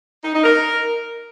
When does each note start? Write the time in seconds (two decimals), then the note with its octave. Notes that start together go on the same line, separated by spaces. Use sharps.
0.23 D#4
0.33 D#4
0.43 A#4